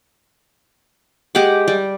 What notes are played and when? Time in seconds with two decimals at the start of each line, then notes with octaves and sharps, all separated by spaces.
1.35 G#3 G4 F#5 D6
1.68 G3